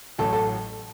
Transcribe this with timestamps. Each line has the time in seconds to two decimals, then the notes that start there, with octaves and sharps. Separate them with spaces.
0.19 A1 A2 F#3 A3 A4
0.33 A4